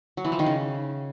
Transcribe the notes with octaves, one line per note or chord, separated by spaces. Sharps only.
F#3
E3
F3
D#3
C#3